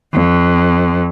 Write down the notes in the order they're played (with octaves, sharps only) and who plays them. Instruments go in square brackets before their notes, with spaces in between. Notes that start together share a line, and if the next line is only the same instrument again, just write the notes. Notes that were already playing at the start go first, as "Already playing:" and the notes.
[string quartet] F2